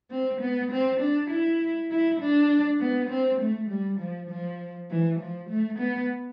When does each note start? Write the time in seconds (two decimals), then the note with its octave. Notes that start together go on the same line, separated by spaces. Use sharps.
0.10 C4
0.41 B3
0.71 C4
1.01 D4
1.30 E4
1.91 E4
2.20 D4
2.80 B3
3.10 C4
3.41 A3
3.70 G3
4.00 F3
4.30 F3
4.90 E3
5.20 F3
5.50 A3
5.79 B3